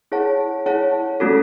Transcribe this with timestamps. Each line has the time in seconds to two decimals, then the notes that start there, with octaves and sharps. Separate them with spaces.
0.12 E4 G#4 C#5 F#5 A5
0.66 E4 G#4 C#5 F#5 A5
1.20 A3 C#4 F#4 A4